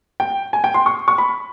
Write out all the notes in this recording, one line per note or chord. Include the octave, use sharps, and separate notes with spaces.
G5
G#5
G5
C6
C#6
C#6
B5